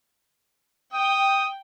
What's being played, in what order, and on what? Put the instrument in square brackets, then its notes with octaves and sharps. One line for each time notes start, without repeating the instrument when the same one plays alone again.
[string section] G5 [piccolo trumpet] D#6